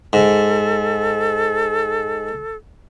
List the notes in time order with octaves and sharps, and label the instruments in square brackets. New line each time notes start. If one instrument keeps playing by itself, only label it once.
[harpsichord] G#2 [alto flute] A4